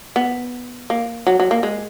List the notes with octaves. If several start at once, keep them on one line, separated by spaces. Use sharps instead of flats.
B3
A#3
F#3
F#3
A#3
G#3